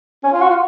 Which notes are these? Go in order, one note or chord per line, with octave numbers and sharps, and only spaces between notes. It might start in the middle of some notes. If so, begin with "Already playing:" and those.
C#4
F4
F#4
F4